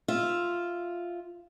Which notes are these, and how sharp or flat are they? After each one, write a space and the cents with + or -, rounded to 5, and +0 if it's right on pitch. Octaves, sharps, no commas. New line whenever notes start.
F4 +0 E5 +0